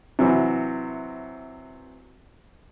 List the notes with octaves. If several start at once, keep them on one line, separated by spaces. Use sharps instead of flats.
C3 E3 F#3